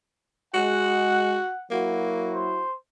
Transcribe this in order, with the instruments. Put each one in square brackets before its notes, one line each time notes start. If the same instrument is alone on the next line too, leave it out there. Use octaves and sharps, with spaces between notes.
[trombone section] G#3 [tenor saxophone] F#4 [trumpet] F#5
[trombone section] F#3 E4 F#4 [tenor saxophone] A#3
[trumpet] C5